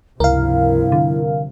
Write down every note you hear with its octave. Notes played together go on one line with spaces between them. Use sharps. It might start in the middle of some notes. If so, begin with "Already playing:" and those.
C#2 G2 C3 F3 E4 A#4 F5
D3